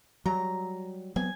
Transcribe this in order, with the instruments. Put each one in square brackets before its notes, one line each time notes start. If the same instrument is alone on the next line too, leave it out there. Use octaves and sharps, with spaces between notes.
[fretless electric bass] F#3 G3 [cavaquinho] A#5
[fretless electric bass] F#3 B3 C4 [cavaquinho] G#5